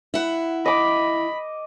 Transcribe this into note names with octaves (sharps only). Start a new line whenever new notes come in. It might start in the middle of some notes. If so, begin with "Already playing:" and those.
E4 F#5
D#5 B5 D6